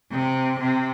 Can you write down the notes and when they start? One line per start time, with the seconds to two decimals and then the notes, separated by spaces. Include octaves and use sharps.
0.11 C3
0.60 C3